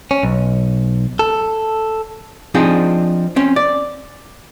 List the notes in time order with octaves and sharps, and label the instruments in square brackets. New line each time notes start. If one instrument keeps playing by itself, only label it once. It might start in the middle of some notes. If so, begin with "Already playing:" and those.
[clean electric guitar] C#4
B1
A4
[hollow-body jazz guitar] F3 C4 D4 D#4 G#4
C4 C#4
D5